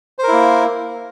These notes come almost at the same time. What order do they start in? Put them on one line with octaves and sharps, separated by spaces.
C5 A#4 E4 A#3